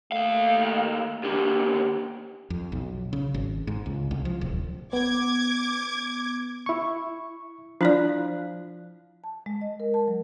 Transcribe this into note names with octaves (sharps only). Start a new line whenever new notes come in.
D#2 A3 F5
D#2 D3 G4
F2
B1
C#3
G#1
G#2
C#2
C2
F3
D1
B3 D6 G#6
E4 C#6
F3 D4 E4 D5 F5 F#6
A5
G#3
D#5
A#4
A5
F#3